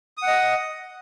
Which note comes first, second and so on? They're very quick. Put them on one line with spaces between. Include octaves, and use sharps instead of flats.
D#6 F#5 D#5